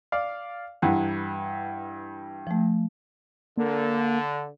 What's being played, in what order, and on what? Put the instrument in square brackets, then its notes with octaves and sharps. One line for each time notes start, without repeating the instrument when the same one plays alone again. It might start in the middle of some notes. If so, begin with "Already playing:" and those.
[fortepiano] D5 F5
[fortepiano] G2 E3 F#5 [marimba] A#5
[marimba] F3 A3
[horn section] D3 [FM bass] A#3